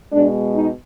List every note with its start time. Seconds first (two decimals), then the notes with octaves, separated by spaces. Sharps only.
0.12 B2 G#3 D4
0.54 D#4